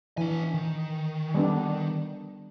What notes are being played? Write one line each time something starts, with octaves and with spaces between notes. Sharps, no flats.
E3 D4 G#5
D#3
G3 B3 D4